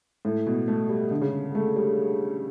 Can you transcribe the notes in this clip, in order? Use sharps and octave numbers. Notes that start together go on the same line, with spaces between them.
A2
B2
A3
G3
D3
C#3
A3
G3